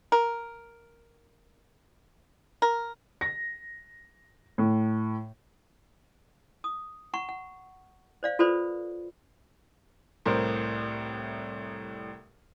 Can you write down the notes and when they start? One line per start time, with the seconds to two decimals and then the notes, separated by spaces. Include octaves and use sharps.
0.12 A#4
2.62 A#4
3.21 A#6
4.58 A2
6.64 D#6
7.14 F#5 A#5 C#6
7.29 F#5
8.23 C5 D5 F5
8.39 F4 A4 B4 C5 D5 B5
10.26 C2 A2 A#4 C5